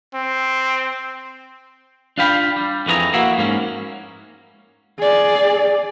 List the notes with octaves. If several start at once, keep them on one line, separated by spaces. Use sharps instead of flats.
C4
D4 F4 F5 G5 B5
G3
F2 E3 F#4 G#4 A#5
A#3 E4 F#4 E5
G#2 A#3 C#4
G#4 D5